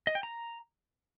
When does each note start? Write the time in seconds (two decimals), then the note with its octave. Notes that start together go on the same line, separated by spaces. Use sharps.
0.07 D#5
0.15 G5
0.23 A#5